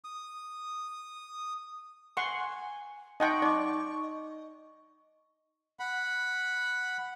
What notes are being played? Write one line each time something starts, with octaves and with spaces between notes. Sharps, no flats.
D#6
F#5 G#5 C6 C#6
D#4 D#5 F#5 G5 C6 C#6
D#4 D5 D6
D#5
F#5 B5